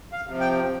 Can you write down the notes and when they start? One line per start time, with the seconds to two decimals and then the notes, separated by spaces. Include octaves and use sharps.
0.12 F5
0.26 C3 F3
0.40 G5